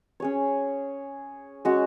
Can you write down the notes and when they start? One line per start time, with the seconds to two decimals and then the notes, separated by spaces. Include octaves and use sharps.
0.20 C#4 G#4 C#5
1.65 G#3 C#4 F#4